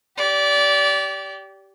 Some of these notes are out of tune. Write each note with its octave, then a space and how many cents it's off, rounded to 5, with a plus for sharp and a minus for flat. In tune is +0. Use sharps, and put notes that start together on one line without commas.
G4 -10 D5 -25